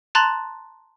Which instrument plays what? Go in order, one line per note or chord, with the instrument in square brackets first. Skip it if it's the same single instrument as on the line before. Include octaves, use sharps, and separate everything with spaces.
[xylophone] A5 A#5 C6 F#6 A6 F#7